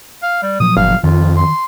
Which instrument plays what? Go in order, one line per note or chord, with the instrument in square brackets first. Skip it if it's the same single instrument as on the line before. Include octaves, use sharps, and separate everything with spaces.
[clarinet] F5
G3
[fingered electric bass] A#2 F3 F#3 [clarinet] D#6
[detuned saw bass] G1 [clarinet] F5
[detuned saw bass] F2 [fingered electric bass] D#3 [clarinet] F4
[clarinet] C6